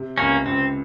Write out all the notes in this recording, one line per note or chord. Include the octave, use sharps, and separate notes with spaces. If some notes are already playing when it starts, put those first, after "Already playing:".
Already playing: C3
C#2 A#3 C#4
C#2 C4